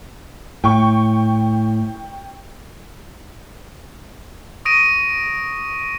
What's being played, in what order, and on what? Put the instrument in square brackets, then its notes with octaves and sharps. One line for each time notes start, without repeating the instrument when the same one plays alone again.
[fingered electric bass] A2 [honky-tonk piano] G5 C#6
[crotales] C#6 D#6 A#6 D7 D#7